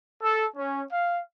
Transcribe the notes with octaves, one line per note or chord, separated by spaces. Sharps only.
A4
C#4
F5